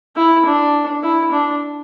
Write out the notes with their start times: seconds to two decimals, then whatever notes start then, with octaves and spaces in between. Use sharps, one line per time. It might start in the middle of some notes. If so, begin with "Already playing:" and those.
0.16 E4
0.46 D4
1.03 E4
1.32 D4